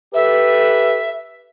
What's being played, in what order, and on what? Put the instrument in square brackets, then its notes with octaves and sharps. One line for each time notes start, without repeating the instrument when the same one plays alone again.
[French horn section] G4 A4 B4 [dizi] E5